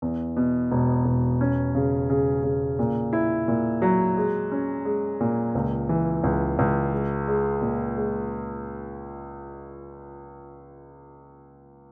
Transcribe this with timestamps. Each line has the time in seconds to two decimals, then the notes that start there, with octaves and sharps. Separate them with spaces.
0.02 E2
0.37 B2
0.71 E1
1.05 E1
1.41 C#4
1.75 C#3
2.09 C#3
2.43 C#3
2.79 A#2
3.13 E4
3.48 A#2
3.82 F#3
4.17 G#3
4.52 C#4
4.85 G#3
5.20 A#2
5.55 C#2
5.89 E3
6.24 C#2
6.59 C#2
6.92 G#3
7.28 G#3
7.61 A#2
7.97 G#3